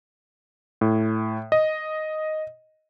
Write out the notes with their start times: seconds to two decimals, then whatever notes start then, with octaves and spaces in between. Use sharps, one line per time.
0.81 A2
1.52 D#5